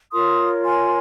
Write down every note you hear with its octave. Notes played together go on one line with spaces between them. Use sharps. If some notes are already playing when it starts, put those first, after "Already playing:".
F4 A#4 C#5 C6 D#6
G#5 C6